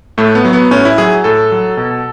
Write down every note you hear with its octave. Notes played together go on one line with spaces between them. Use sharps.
A2 A3
B3
F#3
B3
A2 C#4
E4
F#3 G#4
A2 A4
F#3
B2